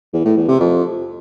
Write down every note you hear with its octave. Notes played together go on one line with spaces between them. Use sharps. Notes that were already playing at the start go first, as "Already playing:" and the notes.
E2
A2
E2
C3
F2